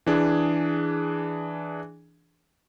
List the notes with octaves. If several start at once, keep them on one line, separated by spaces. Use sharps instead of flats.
E3 D4 G#4